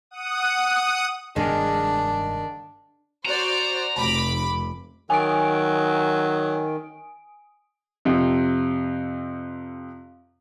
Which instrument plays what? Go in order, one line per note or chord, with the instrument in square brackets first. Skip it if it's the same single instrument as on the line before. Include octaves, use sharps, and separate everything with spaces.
[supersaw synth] F#5 D#6
[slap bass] F1 G2 B3 [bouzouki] D#3 G#3 F5 [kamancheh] D4
[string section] F#4 C5 D5 [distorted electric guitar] A#5
[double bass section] F1 [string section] B5 D6
[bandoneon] D#3 [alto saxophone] F#3 [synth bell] G#5 D#6 D7
[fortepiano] F2 C3